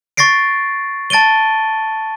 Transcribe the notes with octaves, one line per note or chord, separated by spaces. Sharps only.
C#6 A6 A#6 C7 D7
A5 A6 D7 D#7 G7